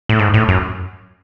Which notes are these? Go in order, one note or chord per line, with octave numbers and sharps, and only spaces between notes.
A2
G#2
A2
F#2